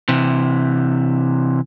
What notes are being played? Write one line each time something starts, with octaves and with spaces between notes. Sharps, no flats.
C3 E3